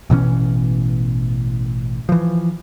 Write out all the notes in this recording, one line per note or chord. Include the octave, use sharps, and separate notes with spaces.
A1 B2 E3 C#4
E3 F3